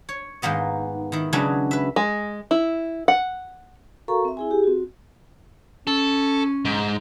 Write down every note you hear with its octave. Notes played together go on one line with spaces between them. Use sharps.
C#5
G#2 D#3 A#3 B3 D#5
D#3 E4
C#3 F#3 G#3 D4 G#4 B4
B4 E5
G#3
E4
F#5
F#4 A4 A#4 F5 A#5 C#6
C4 E5
E4 G#4 G#5
G4 G#4
C4 F#4
C#4 A4
G#2